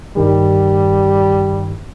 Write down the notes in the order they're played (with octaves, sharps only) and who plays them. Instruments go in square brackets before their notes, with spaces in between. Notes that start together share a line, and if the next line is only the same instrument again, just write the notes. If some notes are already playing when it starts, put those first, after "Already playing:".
[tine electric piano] G2 D#3 [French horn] G3